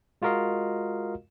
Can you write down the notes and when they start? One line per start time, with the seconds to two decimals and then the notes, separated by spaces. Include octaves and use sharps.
0.22 G#3 F4 F#4 A#4 D#5 F5